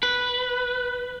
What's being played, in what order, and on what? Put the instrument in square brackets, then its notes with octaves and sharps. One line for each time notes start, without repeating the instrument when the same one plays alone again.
[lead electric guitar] B4